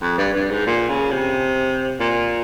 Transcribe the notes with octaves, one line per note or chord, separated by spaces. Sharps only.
F2
G2
G2
G#2
A#2
C#3
C3
A#2